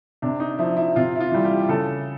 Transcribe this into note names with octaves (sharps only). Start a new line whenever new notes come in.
C3 D4
D#4
F3 E4
E4
C3 F4
E4
F4
E3 G3
G4
C#3 A4